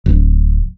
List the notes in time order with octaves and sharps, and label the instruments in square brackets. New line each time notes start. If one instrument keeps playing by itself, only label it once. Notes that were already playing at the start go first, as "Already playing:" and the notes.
[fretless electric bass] D1